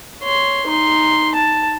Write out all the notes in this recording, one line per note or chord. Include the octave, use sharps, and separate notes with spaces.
C#5 C6
D#4 C6
A5